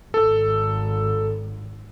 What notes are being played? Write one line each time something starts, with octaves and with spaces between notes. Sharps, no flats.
G#1 A4